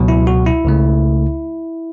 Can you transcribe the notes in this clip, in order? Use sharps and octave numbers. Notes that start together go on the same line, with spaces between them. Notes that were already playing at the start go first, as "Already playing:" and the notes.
Already playing: C#2 B2 F#3
E4
F#4
E4
C#2 C#3 A3